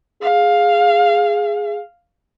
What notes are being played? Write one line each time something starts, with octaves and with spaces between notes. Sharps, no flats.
G#4 F5